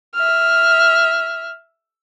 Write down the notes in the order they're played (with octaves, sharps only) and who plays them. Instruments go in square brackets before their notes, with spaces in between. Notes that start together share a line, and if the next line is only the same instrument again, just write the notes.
[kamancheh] E5 F6